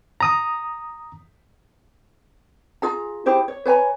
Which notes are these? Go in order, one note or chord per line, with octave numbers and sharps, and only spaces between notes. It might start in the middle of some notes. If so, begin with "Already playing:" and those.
A#5 D#6
F4 G#4 A#5
E4 G4 G#4 C5
C#5
B4 C#5 G#5 A#5